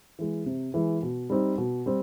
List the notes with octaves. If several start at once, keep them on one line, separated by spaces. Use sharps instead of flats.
E3 G#3
C3
E3 G#3
B2
G3 C4 D#4
B2
G3 C4